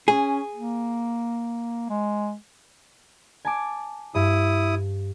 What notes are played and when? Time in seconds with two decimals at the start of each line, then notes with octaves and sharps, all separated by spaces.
0.08 C#4 G#4
0.55 A#3
1.89 G#3
3.45 G#5 A5 D6
4.15 G2 E4 D#6